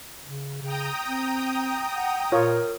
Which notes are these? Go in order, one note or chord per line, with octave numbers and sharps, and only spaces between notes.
C#3
C#3 G5 A#5 D#6
C4
F#5
A#2 F4 A#4 C#5